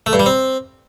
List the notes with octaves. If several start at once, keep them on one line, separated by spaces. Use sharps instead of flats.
A3
G2
G3
C4